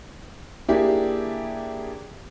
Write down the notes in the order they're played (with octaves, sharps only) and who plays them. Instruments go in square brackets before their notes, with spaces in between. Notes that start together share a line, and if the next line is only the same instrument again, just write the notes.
[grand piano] A#3 D4 E4 G4 G#4